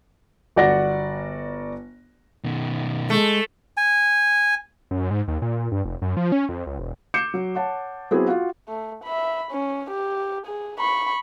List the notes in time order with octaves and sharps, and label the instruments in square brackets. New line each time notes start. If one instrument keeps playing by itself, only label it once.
[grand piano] G1 F#4 D5 F#5 A#6
[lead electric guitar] B2 D#3
[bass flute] G#3 [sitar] A3
[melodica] G#5
[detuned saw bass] F#2
G#2
D#2
A#2
G2
F1
F#2
F3
C#4
F2
C#2
E1
[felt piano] D6 G6 C7 C#7 E7
F#3
C#5 F#5 A5
F#3 B3 C4 E4 F#4 G#4
F4 F#4 F#5
[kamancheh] A3
E5 B5
C#4
G4
G#4
B5 C#6